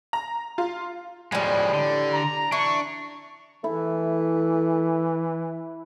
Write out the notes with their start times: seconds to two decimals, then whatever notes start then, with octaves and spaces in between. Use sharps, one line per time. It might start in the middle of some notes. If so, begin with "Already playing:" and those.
0.13 A#5
0.58 F4
1.32 A2 F3 G3 G#3
1.74 D3
2.13 A#5
2.52 E3 D4 C#6
3.64 E3 A3 E4